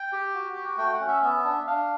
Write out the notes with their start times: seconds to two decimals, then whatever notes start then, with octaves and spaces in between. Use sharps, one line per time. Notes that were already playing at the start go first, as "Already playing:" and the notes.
Already playing: G5
0.12 G4
0.34 F#4
0.56 F#4
0.78 A3 G5
0.93 F#5
1.00 C#4
1.08 E5
1.23 B3 E5
1.44 D4
1.67 D4 F5